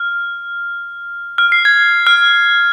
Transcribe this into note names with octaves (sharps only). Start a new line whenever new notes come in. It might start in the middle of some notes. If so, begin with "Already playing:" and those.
Already playing: F6
F6
C7
G#6
F6